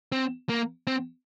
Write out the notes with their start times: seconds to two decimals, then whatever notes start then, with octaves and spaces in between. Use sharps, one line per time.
0.12 C4
0.49 A#3
0.87 C4